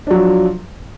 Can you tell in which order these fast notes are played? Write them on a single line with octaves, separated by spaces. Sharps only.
D4 F#3 F3